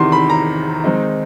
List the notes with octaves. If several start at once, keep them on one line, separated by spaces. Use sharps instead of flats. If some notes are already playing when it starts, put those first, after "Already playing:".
Already playing: E2 C3 D#3 C6
B5
A#5
D#3 G#3 C4 D#4